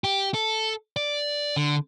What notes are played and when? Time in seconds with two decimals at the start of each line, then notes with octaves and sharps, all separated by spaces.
0.04 G4
0.34 A4
0.96 D5
1.56 D3